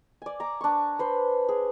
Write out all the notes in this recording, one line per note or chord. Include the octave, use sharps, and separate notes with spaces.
D5 G#5
A#5 D6
D4 C#6
B4 C5
G#4